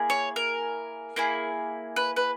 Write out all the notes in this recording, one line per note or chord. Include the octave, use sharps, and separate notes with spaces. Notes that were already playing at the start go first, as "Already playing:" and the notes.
Already playing: A#3 E4 G#4
C#5
A#4
A#3 E4 G#4
B4
B4